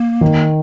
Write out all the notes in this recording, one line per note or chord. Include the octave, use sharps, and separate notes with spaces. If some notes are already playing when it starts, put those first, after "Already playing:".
Already playing: A#3
D#3